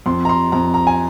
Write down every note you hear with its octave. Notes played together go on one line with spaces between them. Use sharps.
F2 C6
A#5
C6
F2 A#5
A#5
G#5